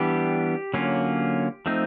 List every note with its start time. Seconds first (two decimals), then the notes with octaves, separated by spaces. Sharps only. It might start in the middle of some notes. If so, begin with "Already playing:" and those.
Already playing: E3 G3 B3 D4 G4
0.74 D3 F#3 A#3 C#4 F4
1.66 F3 A3 C4 D#4